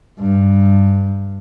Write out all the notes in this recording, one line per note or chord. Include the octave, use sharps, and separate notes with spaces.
G2